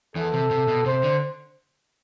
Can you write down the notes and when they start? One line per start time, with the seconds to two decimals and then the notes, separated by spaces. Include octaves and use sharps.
0.15 E2 E3 A4
0.33 C3
0.51 C3
0.68 B2
0.86 C3 C5
1.03 D3